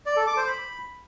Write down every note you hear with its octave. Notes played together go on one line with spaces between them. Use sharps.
D5
A4
D6
C5
B5